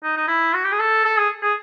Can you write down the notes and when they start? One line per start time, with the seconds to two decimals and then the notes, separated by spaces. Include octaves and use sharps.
0.04 D#4
0.17 D#4
0.28 E4
0.54 F#4
0.65 G4
0.72 G#4
0.79 A4
1.05 A4
1.18 G#4
1.43 G#4